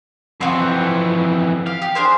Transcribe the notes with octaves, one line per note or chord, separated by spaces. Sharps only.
F2 E3 C4 F#4
G4 F5
G4
D4 G#4 C5